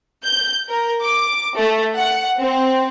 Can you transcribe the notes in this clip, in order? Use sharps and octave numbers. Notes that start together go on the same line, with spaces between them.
G6
A#4
D6
A3
F#5
C4